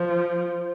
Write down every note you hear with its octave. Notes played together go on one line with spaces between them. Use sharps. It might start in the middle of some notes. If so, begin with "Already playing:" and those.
Already playing: F3